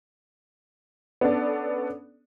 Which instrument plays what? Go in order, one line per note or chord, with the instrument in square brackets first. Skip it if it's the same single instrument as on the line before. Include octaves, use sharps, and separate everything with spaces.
[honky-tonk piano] B3 C#4 D4 A4 D5